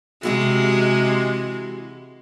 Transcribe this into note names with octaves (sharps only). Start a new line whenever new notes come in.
C3 E3 G#3 F#4 G4